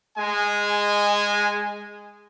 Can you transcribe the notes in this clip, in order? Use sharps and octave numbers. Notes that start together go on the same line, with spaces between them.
G#3 G#5